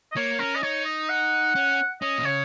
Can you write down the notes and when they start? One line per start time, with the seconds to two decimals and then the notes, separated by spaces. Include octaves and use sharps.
0.12 D#5
0.17 A#3 C#5
0.39 C#4 A#4
0.56 D#5
0.63 D#4 C#5
0.85 D#5
1.10 F#5
1.55 C#4
2.02 C#4 D#5
2.18 A#2
2.24 C#3 C#5